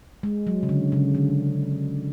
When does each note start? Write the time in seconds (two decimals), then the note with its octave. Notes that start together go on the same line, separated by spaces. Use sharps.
0.23 G#3
0.47 F#3
0.63 C#3
0.69 D3
0.92 C#3
1.15 D3